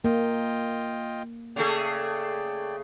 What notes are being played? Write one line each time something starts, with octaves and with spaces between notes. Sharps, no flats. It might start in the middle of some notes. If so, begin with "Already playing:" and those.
A#3 F4 D#5 G5
C#3 A3 G#4 D5 G5